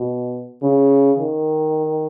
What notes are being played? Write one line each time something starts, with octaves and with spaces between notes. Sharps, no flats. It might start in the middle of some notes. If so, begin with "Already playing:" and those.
Already playing: B2
C#3
D#3